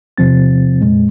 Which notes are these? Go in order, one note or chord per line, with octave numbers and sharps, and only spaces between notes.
E2 C3 F3 C4 A6
F2 A#2 G#3